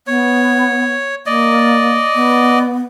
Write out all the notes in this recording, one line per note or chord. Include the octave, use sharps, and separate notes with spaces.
B3 C#5
A#3 D5 D#5
B3